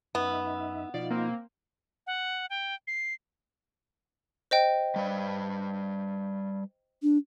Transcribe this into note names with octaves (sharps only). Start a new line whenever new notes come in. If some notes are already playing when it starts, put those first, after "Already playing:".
F#2 B3 D#4 E5
B2 F3 D#4 F4 D5
A#3 C4
F#5
G5
C7
C5 D#5 G5
G3 B4 D5
D4